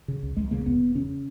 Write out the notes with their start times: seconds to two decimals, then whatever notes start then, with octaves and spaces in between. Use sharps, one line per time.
0.08 C#3
0.23 C#2
0.37 C#2 G#3
0.51 C#3 A#3
0.66 E1 B3
0.80 E1
0.95 C#3 C#4